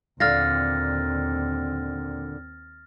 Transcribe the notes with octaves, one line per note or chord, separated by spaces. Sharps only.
D#2 A#2 D3 C4 F5 F6 A6 A#6